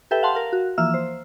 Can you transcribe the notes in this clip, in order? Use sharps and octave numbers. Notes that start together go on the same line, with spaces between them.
G4 A4 B4 E5 G5
F5 F#5 A5 C6
A#4 F5
F#4
E3 F3 A#3 E5 E6 F6
C5